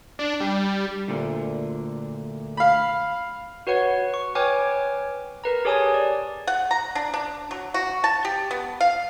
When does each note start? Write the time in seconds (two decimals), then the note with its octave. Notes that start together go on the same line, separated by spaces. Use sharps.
0.19 D4
0.40 G3
1.08 D2 A#2 D3
2.57 F5 B5
3.67 F#4 B4 C#5 F#5
4.14 C#6
4.35 B4 C#5 G5 G#5 D6 F6
5.44 A#4 B4 A#5
5.65 G4 G#4 C#5 G#5 A5 D#6
5.94 D5
6.47 F#5
6.71 A#5
6.95 D4
7.14 D4
7.51 F#3
7.74 F#4
8.04 A5
8.25 G4
8.51 B3
8.81 F5